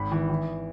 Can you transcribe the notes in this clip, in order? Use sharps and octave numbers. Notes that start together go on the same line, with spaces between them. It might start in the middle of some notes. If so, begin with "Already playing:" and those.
Already playing: G#1 B5
E3
E3